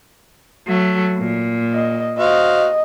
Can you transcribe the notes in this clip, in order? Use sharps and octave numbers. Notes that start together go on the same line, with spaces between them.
F#3 A3
A#2
D#5
F#4 C5 D#5 F5